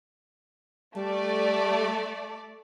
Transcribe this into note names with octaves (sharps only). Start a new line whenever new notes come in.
G3 A3 D5